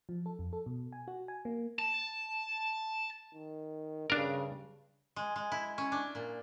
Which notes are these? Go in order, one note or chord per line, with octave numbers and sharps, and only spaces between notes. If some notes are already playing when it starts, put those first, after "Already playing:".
F3
A4
F2
A4
B2
G#5
F#4
G#5
A#3
A5
D#3
G2 C#3 D4 A#4
G#3
G#3
E4
C#4
D4
A#2